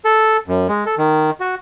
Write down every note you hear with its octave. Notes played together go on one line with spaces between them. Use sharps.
A4
F#2
G#3
A4
D#3
F#4